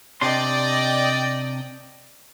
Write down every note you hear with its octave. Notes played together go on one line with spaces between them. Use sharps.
C3 D4 D5 D#5 G5 C6